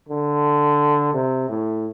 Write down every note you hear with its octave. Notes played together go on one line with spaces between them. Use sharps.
D3
C3
A2